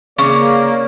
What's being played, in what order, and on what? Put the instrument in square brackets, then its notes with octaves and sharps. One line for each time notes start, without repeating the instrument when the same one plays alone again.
[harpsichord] C#3 [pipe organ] A#3 [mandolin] C#4 [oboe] D5